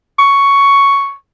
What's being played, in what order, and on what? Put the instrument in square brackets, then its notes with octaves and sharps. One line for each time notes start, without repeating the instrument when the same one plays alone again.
[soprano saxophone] C#6